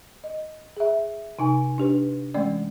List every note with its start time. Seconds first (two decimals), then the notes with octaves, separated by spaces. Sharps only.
0.24 D#5
0.77 G#4 E5
1.39 C3 D#4 G#5
1.78 D4 G4 B4
2.34 E3 G#3 A3 C#4 D5